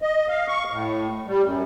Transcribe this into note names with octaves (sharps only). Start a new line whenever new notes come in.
D#5
F5
C#6
A2
G3
F#2